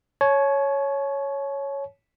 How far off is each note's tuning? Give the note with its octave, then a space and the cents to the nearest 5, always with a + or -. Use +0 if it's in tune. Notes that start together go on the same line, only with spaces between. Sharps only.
C#5 +0 A5 -45